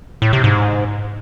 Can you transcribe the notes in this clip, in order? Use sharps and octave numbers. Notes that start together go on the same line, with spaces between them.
A2
C3
G#2